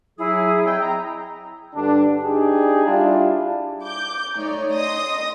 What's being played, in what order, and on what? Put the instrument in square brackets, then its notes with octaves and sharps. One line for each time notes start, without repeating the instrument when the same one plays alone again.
[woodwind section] F#3 G#4 [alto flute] E4
[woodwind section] C4 D#5 G5
A#5
[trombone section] G2 D3 D4
D4 D#4 G4 G#4
G3 D4 E4 F4
[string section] D6 G6
A3 D#4 C#5 D5
D#5 C6 D#6 A#6